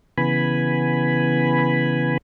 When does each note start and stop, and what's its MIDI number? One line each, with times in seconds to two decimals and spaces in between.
0.18 2.17 49
0.18 2.17 52
0.18 2.17 59
0.18 2.17 80
0.18 2.17 83